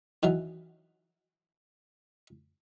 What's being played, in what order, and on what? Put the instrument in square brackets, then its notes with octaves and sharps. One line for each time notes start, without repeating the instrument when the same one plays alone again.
[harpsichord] D#3 E3 F#3